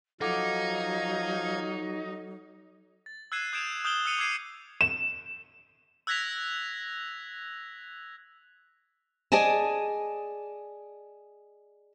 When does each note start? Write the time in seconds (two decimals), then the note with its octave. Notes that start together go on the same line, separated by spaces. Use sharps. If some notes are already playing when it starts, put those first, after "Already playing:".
0.21 F3 F#3 D#4 A4 F5 F#5 D6 G#6
3.06 A6
3.32 E6 F#6 G#6 C7 D#7 E7
3.53 D#6 G6 G#6 D7 E7 F7
3.85 D#6 F6 G6 D7 F#7 G7
4.05 E6 C7 C#7 D#7 F7 F#7
4.19 D6 E6 G#6 C7 D7 D#7
4.81 E7
6.07 E6 F#6 G#6 A#6 B6 F7
9.32 G#4 D5 D#5 G#5 A5